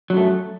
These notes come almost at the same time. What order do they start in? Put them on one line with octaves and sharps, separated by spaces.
F#3 F#2 A3